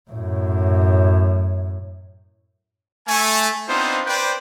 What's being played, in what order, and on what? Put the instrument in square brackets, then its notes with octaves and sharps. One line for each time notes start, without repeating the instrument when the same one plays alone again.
[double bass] F#2 A2
[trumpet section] A3 G#5
B3 C4 D4 D#4 F4 C5
B4 C5 D5 G5